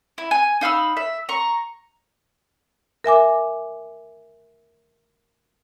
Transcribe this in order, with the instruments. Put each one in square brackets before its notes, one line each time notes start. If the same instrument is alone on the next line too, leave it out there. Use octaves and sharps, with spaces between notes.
[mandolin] E4
G#5
D#4 F5 B5 E6
E5
A#5 C#6
[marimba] A#4 E5 G#5 D6